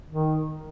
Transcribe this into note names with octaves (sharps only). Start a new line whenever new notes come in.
D#3